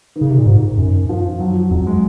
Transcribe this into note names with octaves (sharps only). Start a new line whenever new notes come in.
D#3
C#3
C3
A#2
G#2
F#2
F3
F#3
F2 F#3
G#3